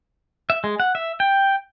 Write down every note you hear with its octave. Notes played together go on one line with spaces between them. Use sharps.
E5
G#3
F#5
E5
G5